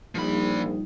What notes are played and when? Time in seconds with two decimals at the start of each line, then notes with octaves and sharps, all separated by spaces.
0.15 A#1 F3 G3 D#4 B5